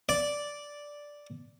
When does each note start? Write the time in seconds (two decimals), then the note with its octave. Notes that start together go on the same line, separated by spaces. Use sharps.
0.09 D5